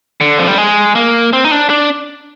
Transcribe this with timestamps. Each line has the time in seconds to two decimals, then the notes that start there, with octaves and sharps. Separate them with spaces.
0.21 D3
0.39 F3
0.48 G3
0.58 G#3
0.95 A#3
1.33 C4
1.44 D#4
1.51 D4
1.70 D4